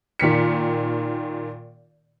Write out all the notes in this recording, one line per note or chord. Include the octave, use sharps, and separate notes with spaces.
A#2 D#3 B6 C#7